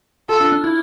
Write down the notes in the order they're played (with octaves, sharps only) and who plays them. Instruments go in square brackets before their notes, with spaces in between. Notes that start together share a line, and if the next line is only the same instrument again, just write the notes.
[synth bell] F4 [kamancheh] A4
[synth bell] D4
D4
E4